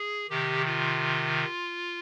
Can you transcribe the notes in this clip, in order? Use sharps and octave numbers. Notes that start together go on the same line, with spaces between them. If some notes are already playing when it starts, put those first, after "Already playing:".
Already playing: G#4
C3 D#3 G4
F4